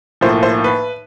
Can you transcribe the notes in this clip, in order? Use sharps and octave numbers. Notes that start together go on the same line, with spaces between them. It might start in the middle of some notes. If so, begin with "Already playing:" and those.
B1 A2 F3 A#3 C5
C5
B4